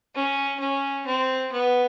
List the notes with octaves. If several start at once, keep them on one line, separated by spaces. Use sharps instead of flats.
C#4
C#4
C4
B3